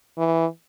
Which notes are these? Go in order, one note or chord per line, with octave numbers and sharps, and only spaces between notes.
E3